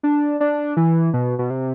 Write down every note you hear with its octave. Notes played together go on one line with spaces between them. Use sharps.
D4
D4
E3
B2
B2
C3